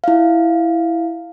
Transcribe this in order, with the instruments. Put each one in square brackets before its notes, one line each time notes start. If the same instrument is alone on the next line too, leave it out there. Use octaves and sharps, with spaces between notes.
[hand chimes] E4 F5